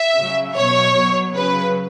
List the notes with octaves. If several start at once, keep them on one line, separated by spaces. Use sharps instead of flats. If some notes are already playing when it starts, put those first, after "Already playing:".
Already playing: E5
C#3 F#3
B2 F#3 C#5
B2 F#3
C#3 F#3 B4